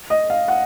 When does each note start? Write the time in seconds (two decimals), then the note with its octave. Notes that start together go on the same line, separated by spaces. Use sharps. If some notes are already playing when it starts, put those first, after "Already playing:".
0.10 D#5
0.30 F5
0.48 F#5